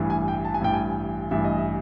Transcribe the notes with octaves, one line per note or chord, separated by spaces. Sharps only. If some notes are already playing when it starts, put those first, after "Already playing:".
Already playing: A1 G2 E3
G#5
G5
A5
G#5
A1 G2 E3 G5
G#5
A1 G2 E3 E5
D#5
E5